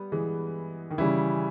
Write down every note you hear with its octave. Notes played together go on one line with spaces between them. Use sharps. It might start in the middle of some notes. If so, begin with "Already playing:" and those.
Already playing: G3 B3
E3 G#3
D#3
C#3 E3 G3 C#4 E4